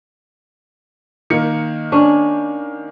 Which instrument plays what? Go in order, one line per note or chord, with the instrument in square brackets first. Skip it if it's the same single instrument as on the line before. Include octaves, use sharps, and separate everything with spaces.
[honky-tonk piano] D#3 A#3 C#7
[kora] C#4 D4